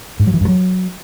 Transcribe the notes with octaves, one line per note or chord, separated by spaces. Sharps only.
G#2
F#3
E3
G2
F#3